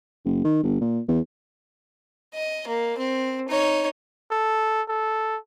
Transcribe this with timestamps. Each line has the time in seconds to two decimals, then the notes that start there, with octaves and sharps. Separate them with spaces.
0.25 F#1
0.45 D#3
0.63 G1
0.81 A#2
1.08 E2
2.34 D#5
2.68 A#3
2.98 C4
3.49 D#4 C#5
4.31 A4
4.88 A4